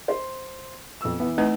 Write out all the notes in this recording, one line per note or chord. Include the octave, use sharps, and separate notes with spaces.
C5
F2 B3 E6
E3 B3
A3 C4 D#4 B4